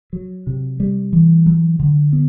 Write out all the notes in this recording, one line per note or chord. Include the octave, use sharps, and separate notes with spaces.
F#3
C3
G3
E3
F#3
D3
B3